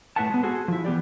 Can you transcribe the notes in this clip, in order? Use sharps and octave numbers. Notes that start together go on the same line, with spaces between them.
A2 F#4 B4 E5 F#5 A5
G#3 B3
F#4 G#4 A4 C5
F3 E4
E3 B3 G4 D5